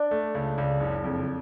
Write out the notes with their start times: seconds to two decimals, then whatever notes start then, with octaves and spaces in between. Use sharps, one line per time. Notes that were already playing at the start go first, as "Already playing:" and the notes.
Already playing: D4
0.11 A3
0.35 C#2
0.58 C#2
0.80 F#1
1.04 F2